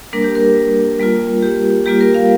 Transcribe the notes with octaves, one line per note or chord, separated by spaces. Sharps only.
G3 A#3 D4 A#4
G4
A#4
G3 A#3 F4
G4
G3 A#3 F4 G4
A#4
F5